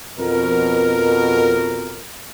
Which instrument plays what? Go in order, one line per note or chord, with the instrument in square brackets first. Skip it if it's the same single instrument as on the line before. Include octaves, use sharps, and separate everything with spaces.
[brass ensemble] F2 B2 A#4